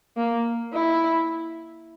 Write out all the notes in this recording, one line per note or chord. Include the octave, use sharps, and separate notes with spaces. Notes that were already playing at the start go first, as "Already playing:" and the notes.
A#3
E4